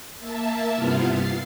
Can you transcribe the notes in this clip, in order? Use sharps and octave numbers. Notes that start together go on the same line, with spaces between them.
A#3 E5 A5
G2 C3 B3 E4 F4 F5
A6 C7